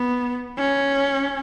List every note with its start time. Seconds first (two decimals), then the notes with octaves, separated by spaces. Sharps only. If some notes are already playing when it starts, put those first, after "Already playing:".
Already playing: B3
0.58 C#4